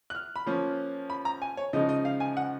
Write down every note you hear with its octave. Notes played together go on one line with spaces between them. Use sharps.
F#6
F6
B5
F3 A#3 C#4
B5
A#5
G#5
C#5
C#3 F3 G#3 D#4 D#5
D#5
F5
G#5
F#5